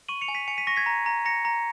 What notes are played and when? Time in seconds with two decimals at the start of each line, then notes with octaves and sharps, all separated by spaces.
0.08 C#6 D#7 F#7
0.21 C#7 F7
0.28 G#5
0.34 B6 D#7
0.48 G#5 C#7 F7
0.58 B6 D#7
0.67 C#6 A#6
0.76 G#6 B6
0.86 A#5
1.06 A#5
1.25 A#5 A#6 C#7
1.45 A#5